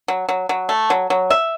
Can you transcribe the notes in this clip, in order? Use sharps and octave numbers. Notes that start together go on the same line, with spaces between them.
F#3
F#3
F#3
A3
F#3
F#3
E5